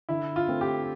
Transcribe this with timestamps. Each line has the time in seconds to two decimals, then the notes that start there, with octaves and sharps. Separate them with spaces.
0.09 D3 E4
0.36 F4
0.48 A3 C4
0.61 G4